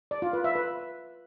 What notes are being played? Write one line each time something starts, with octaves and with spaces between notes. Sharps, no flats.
D5
F4
B4
E5
B4